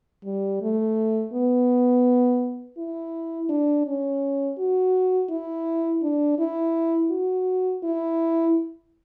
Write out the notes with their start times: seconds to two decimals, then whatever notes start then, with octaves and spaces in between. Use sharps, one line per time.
0.25 G3
0.62 A3
1.33 B3
2.78 E4
3.49 D4
3.87 C#4
4.58 F#4
5.30 E4
6.02 D4
6.39 E4
7.11 F#4
7.84 E4